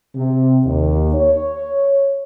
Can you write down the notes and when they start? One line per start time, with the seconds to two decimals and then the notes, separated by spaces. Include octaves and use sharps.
0.15 C3
0.65 D#2
1.14 C#5